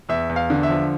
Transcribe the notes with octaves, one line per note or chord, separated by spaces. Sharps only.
E2 E5
E2
F5
D3
E5
F3